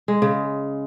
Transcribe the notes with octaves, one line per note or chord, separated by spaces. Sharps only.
G#3
C#3